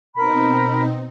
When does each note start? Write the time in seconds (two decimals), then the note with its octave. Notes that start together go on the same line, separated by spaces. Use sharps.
0.15 B2 C4 D#4 A#4 B5